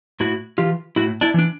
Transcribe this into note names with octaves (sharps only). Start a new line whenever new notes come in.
A2 E4 F#4
E3 F4 G4
A2 E4 F#4
D4 E4
E3 D4